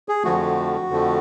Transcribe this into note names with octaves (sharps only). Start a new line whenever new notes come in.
G#4
F2 D3 F3 A3 F#4
F2 D3 F3 A3